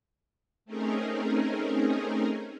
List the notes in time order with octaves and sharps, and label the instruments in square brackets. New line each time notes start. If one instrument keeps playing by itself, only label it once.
[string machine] A3 C4 C#4 D#4 G#4 A#4